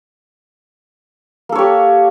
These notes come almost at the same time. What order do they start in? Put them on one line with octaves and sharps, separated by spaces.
A#3 A4 C#5 G4